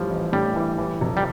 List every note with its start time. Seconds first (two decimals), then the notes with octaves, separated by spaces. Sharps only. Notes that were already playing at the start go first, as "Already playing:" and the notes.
Already playing: A2 E3 F3 G3
0.10 A1
0.33 A2 G3
0.56 E3
0.78 E3
1.01 F1
1.17 G3